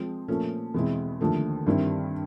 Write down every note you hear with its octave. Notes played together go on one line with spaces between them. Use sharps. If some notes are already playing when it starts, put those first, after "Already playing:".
Already playing: F3 G#3 C4
A#2 F3 A3 C#4
E2 B2 G#3 C4 E4
D#2 D3 F3 A3
G2 D#3 G3 C4 E4